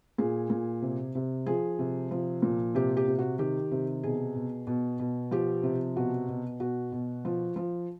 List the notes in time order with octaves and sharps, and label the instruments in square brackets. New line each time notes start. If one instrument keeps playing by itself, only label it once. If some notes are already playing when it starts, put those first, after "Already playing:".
[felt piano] A#2 G#4
A#2
C3
C3
F3 G#4
C3
F3
A#2
C3 G4
G4
C3
F#4
D#3 G4
C3
B2 G#4
B2
B2
B2
F3 G4
C3
B2 F#4
B2
B2 F#4
B2
F3
F3